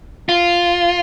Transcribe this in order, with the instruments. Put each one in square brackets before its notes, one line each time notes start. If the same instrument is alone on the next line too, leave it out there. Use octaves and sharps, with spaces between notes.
[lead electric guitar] F4